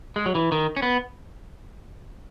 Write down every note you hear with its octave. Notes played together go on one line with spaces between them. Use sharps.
G#3
F#3
E3
D#3
C#4
B3